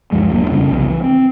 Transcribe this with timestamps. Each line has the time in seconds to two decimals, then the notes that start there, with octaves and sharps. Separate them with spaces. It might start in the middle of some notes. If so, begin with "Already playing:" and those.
0.12 D2 G2 F3 G#3
0.31 D#1 F#3 A#3 D4
0.51 F2 C#3 G3 C#4
0.72 C2 C#3 F3 B3
0.89 E3
1.04 C4